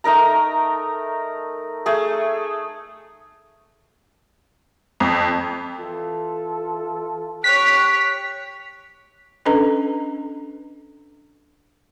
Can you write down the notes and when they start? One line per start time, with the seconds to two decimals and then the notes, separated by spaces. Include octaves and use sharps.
0.04 A3 D#4 A#4 A#5
1.86 A3 G#4
5.00 F2
5.78 E3 F4 A4
7.44 G4 C#5 F#6 B6
9.45 C#4 D4 A4 B4 D#5 A#5